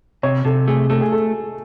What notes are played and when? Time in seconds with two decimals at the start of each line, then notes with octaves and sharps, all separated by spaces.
0.23 C3 C#5
0.45 C3 A4
0.68 A3 G#4
0.90 A3 A4
1.01 G#4
1.12 A4